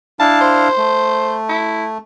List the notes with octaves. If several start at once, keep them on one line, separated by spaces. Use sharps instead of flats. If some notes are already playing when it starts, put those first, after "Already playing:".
D4 E4 F5 A5
C5
A3
E4